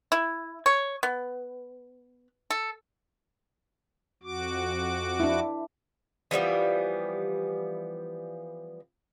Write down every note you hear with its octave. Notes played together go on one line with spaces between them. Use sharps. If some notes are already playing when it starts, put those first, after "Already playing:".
E4
C#5
B3
A4
F2 F#4 D6
D4 E4
E3 F3 G3 B3